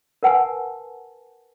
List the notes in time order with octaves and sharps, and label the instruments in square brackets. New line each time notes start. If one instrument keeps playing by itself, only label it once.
[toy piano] A#4 B4 F#5 G#5 A5